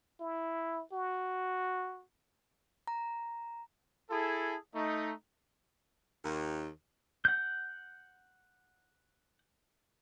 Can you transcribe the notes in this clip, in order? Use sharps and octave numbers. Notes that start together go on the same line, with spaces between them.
E4
F#4
A#5
E4 G#4 A4
A3 D#4
D#2
F#5 G6